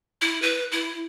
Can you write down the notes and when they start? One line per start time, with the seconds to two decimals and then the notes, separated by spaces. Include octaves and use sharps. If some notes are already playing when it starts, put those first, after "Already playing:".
0.21 E4
0.42 B4
0.72 E4